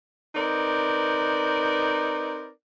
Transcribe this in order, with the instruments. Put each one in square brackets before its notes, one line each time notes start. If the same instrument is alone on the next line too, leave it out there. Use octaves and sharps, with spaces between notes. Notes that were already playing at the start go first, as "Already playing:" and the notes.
[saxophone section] C4 D#4 A#4 B4 D5